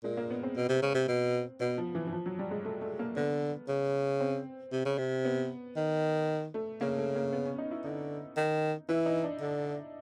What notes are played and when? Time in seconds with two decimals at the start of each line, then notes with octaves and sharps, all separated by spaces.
0.04 A#2 G#3
0.17 A#3
0.31 B3
0.43 C4
0.57 B2
0.69 C3
0.82 C#3
0.95 C3
1.08 B2
1.60 B2 B3
1.78 F3
1.95 E3
2.07 E3
2.13 F3
2.26 F#3
2.39 G3
2.51 G#3
2.65 A3
2.81 A3
2.99 A#3
3.16 D3 B3
3.68 C#3
4.20 C4
4.72 C3
4.85 C#3
4.98 C3
5.25 B3
5.76 D#3
6.54 A3
6.81 C#3 A#3
6.97 A3
7.16 A#3
7.33 B3
7.46 C#4
7.58 D#4
7.71 E4
7.84 D3 D#4
8.37 D#3
8.89 E3 E4
9.06 D#4
9.24 D4
9.41 D3